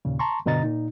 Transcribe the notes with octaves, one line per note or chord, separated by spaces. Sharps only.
D#2 A#2 C#3
A5 A#5 C6 C#6
G2 B2 D3 D#5 A#5 A6
A#2 D#4